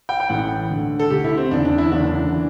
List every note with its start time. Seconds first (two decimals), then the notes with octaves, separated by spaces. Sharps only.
0.09 G5
0.20 G5
0.29 A1 A2 E3 F#5
0.70 D2 D3
0.99 A4
1.10 D2 D3 G4
1.24 E4
1.38 C4
1.51 F#1 E2 D3 D4
1.65 D4
1.78 E4
1.92 F#1 E2 D3 D4
2.32 E3